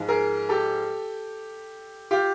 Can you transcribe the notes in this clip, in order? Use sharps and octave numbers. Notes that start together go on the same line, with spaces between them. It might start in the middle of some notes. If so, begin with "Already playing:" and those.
Already playing: G#2 F3 G#3
G#4 A#4
G4 A4
F4 G4